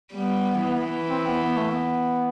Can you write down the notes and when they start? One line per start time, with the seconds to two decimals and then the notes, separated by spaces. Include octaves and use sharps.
0.12 G3 B3
0.62 E3
1.10 C4
1.27 B3
1.43 B3
1.57 A3
1.70 B3